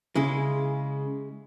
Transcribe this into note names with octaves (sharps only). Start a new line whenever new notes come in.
C#3 G#3 E4